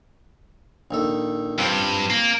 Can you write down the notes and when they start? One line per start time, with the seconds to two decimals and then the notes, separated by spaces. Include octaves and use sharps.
0.91 A#1 D#3 A4
1.58 G2 C4 F4 C5
2.10 A#3